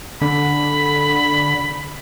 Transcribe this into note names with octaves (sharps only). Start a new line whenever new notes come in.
D3 B5